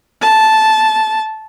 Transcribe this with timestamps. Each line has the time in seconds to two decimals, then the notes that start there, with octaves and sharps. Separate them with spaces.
0.22 A5